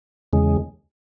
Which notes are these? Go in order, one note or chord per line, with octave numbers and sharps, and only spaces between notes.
E2 C#3 G#3